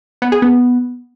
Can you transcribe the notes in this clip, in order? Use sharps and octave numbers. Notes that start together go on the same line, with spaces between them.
B3
G#4
B3